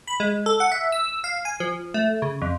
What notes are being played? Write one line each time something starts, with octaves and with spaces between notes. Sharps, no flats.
B5
G#3
A4
F#5
E5
E6
F5
G#5
F3
A3
C#3
F2